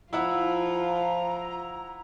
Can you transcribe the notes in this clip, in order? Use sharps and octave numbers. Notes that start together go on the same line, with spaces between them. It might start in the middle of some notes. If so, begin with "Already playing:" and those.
F3 E4 F4 F#5 A#5 E6